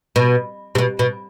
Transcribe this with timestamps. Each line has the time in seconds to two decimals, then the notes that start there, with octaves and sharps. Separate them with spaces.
0.16 B2
0.75 C3
0.78 B2
0.99 B2